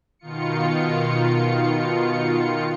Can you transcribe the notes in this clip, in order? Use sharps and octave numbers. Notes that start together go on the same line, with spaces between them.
B2 D#3 F4 C#7